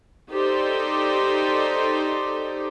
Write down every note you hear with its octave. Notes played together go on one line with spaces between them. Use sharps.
D#4 G4 A4 C5 D5